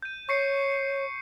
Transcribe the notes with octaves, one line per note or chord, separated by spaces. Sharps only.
G6 D#7
C#5 C#6 C7 C#7